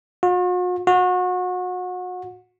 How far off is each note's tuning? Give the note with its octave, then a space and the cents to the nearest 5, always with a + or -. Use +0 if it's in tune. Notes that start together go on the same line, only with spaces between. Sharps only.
F#4 -45
F#4 -30